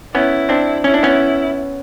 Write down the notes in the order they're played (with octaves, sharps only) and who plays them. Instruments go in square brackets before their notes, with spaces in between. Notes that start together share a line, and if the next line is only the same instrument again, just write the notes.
[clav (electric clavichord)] B3 C#4 [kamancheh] E4
[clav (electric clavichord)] C4 D4
[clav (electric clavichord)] C#4 [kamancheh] E4
[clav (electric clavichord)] D4
B3 C#4